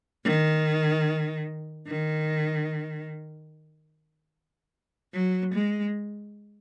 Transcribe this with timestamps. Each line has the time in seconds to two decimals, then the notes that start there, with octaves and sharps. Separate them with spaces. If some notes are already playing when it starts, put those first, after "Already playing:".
0.23 D#3
1.87 D#3
5.13 F#3
5.53 G#3